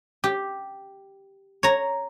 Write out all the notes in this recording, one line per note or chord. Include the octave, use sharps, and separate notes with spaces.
G4
C#5 A#5